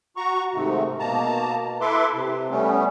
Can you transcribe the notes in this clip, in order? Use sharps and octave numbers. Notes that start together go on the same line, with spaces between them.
F#4 A#5 C#6
G#2 C3 D#3 A3
B2 A#3 A5 A#5
E4 A4 B4 E5 C6 D6
C3
G3 A3 B3 C#4